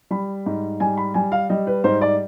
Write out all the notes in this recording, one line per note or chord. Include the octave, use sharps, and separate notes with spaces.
G3 B5
G#2
G3 G#5
B5
G3 G#5
F5
G3 D#5
B4
G#2 C5
D5